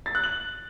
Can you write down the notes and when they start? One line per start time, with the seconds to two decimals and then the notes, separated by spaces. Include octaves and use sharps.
0.06 A6
0.15 F#6
0.24 F#7